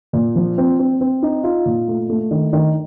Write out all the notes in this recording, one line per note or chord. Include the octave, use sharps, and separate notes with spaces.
A#2
F3
C4
C4
C4
D#4
F4
A#2
A3
A3
D#3
D#3